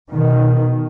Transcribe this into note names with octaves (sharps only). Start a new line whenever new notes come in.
B2 D#3